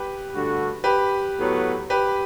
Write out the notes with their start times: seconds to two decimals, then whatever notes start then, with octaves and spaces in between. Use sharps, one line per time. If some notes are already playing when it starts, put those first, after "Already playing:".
Already playing: G4 B4
0.30 G2 D3 A3 D4 F#4
0.84 G4 B4
1.36 A2 F#3 B3
1.90 G4 B4